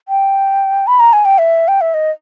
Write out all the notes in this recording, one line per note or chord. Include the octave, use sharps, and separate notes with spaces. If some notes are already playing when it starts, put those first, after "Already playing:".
G5
B5
A#5
G#5
G5
E5
G5
E5
D#5